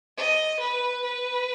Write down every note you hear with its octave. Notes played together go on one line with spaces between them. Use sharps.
D#5
B4
B4